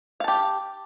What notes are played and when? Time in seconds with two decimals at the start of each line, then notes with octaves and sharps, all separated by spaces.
0.20 F5
0.24 A5
0.28 G4